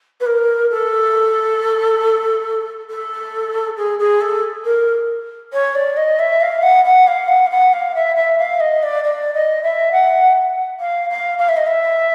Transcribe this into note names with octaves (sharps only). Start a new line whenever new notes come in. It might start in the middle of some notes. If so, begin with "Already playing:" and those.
B4
A#4
A4
A4
G#4
G#4
A4
A#4
C#5
D5
D#5
E5
F5
F#5
F#5
F5
F#5
F5
F#5
F5
E5
E5
F5
D#5
D5
D5
D#5
E5
F#5
F5
F5
F5
E5
D#5
E5